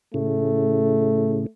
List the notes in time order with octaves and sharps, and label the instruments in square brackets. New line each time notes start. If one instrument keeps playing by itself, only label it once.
[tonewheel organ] A2 C#3 [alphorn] A3